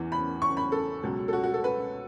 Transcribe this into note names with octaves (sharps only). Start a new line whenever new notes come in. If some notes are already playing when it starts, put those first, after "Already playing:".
Already playing: E2 E3
B5
C#6
B5
A4
C#2 B2 F#3
A4
F#4
F#4
A4
B4